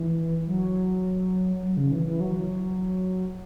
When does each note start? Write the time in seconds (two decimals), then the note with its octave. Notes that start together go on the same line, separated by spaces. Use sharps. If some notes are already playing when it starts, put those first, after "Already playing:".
Already playing: E3
0.47 F#3
1.62 F#3
1.77 C#3
1.92 E3
2.06 E3
2.20 F#3